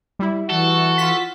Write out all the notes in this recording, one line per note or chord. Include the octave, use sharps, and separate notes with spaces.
G3 E4
E3 F#4 A4
F4 B6